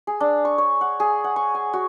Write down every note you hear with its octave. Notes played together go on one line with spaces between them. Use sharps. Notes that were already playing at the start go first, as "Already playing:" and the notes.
G#4
D4
C#6
C#5
F#5
G#4
F#5
C#6
G#5
F#4